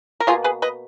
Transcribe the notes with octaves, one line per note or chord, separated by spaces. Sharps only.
A#4
B2 A#3 F4 G#4
G#4 B4
B4 D#5